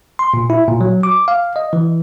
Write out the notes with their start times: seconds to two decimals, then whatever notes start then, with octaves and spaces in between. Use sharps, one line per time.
0.19 C6
0.34 A#2
0.50 E4
0.68 A#2
0.81 F#3
1.03 D6
1.28 F5
1.56 D#5
1.73 E3